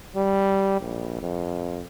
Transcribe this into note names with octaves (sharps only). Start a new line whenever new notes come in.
G3
A#1
F2